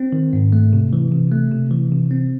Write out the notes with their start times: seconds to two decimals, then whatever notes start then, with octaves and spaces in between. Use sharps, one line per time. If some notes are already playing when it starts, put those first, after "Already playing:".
Already playing: C4
0.12 D#3
0.33 G#2
0.53 A3
0.73 C3
0.93 E3
1.12 C3
1.32 A3
1.51 C3
1.71 E3
1.92 C3
2.11 C4